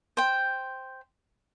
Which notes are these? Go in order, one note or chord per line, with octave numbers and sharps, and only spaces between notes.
C5 G5